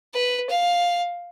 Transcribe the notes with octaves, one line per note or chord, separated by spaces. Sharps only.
B4
F5